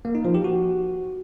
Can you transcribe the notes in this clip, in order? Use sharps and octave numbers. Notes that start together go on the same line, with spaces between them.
A#3
D#4
F3
G4
F#4